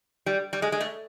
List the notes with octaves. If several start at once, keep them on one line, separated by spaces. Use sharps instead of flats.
G3
G3
G#3
G#3
A3